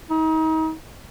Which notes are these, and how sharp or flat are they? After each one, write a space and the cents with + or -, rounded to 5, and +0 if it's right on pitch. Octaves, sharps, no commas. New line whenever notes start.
D#4 +35